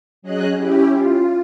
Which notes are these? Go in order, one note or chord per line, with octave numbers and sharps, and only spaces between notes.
F#3 C#4 G#4 D#5 F#6
C#4 E4 G4
F4